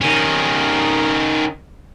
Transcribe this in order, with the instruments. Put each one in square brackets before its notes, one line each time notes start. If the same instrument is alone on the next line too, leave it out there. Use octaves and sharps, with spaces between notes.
[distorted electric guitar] D#3 C#4